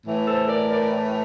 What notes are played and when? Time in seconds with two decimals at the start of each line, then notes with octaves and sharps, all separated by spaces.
0.05 A2 E3
0.27 A4 C5
0.48 A#4 D5
0.70 A#4 D5